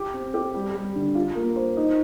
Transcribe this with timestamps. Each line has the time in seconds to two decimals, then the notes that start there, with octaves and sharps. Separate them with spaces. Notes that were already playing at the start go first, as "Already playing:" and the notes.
Already playing: G4
0.14 C4
0.34 G4
0.54 G3
0.74 G3
0.95 D3
1.15 F4
1.35 A#3
1.56 C5
1.77 D#4